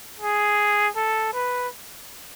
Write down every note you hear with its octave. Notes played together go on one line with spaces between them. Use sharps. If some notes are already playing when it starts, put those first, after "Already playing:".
G#4
A4
B4